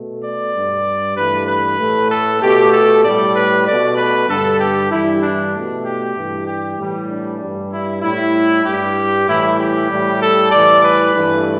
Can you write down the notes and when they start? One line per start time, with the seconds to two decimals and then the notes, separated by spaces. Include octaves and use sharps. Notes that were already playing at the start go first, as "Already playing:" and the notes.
Already playing: B2 A3
0.22 D5
0.53 G2 G3
1.16 G2 E3 A3 B4
1.47 B4
1.78 A2 A3
2.10 A4
2.41 B2 A3 G4
2.72 A4
3.03 A2 G3 D5
3.34 B4
3.66 B2 A3 D5
3.97 B4
4.28 G2 D3 G3 A4
4.59 G4
4.90 G2 E3 G3 E4
5.21 D4
5.53 B2 A3
5.84 G4
6.15 G2 E3 G3
6.46 G4
6.77 A2 E3 G3
7.09 D4
7.39 G2 G3
7.71 E4
8.02 A2 G3 E4
8.65 G2 G3 G4
9.27 A2 E3 G3 E4
9.59 G4
9.89 A2 G3
10.21 A4
10.52 A2 E3 G3 D5
10.83 B4
11.15 G2 E3 A3